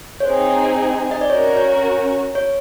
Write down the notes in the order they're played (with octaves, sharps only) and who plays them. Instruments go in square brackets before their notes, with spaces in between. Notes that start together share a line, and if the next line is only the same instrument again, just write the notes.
[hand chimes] C#5
[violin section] C4 D#4 G#4 [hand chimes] C5
[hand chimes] D#5
D5
[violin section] C#4 F#4 A#4 [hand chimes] C#5
[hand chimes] C#5
C#5